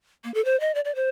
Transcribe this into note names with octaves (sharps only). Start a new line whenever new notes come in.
A#3
A4
C5
D#5
D5
D5
C5